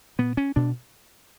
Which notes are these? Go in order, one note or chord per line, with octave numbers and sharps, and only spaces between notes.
A#2 B3
C#4
B2 D4